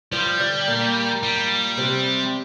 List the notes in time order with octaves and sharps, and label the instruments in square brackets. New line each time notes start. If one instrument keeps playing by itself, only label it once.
[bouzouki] F3 F4 [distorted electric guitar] G3
[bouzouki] D3 D4
A#2 A#3
[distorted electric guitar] G3
[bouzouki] C3 C4